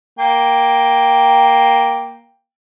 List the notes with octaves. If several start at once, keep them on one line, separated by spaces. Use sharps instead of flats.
A#3 G5